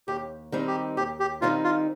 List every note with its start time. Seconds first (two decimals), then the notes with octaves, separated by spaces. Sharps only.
0.08 D#2 G4
0.52 D#3 G3 C4 D#4
0.67 G4
0.97 D#2 G4
1.20 G4
1.41 D#3 G3 C4 D#4 F4
1.64 F4